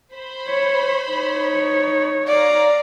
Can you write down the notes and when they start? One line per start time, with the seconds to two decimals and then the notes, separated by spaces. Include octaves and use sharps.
0.13 C5 B5
0.49 C#5
1.11 D#4 C#5
2.28 D5 F5 A#5